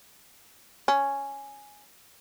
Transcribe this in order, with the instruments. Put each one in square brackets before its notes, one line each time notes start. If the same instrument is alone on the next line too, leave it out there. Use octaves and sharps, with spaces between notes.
[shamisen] C#4